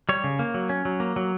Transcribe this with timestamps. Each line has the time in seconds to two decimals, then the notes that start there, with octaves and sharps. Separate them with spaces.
0.09 G3 C#5
0.24 C#3
0.39 A#3
0.54 F#3
0.69 C#4
0.85 F#3
1.00 A#3
1.16 F#3